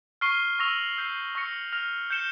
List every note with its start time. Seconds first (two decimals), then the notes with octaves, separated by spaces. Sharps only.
0.21 C#6 F6 C7 G7
0.59 C#6 E6 A#6 F7
0.98 E6 G6 C7
1.35 C#6 E6 A#6 C#7
1.72 F6 A#6 F7
2.10 G6 C#7 E7 G7